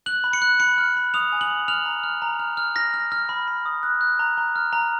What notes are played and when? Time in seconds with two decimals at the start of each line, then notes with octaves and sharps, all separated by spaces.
0.06 F#6 F#7
0.24 B5
0.33 C#7
0.42 F#6
0.60 B5 C#7
0.78 F6
0.96 B5
1.14 D#6 F7
1.32 G#5
1.41 F#7
1.50 D#6
1.68 F6 F7
1.85 A#5
2.03 F6
2.22 A#5
2.39 F6
2.57 F6
2.76 F6 A#6
2.94 F6
3.12 F6
3.29 B5
3.48 B5
3.65 D#6
3.83 F#6
4.01 F#6
4.19 A#5
4.38 A#5
4.56 F6
4.73 A#5